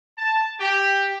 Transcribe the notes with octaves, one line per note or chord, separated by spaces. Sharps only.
A5
G4